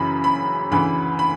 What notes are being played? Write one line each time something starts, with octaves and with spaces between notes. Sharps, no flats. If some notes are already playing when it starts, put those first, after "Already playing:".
Already playing: F#2 C#3 E3 B5
B5
D2 C#3 E3 B5
B5